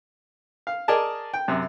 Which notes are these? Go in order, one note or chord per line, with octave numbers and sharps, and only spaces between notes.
F5
G#4 A#4 D5 D#5 G#5 A5
G5
F#2 C3